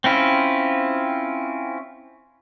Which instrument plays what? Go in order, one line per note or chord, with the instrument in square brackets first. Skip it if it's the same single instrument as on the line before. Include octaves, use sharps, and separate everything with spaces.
[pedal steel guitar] C4 C#4 E4 F4